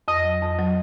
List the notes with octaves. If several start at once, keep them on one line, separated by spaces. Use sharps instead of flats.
F2 D#5
F#3
F2
F#3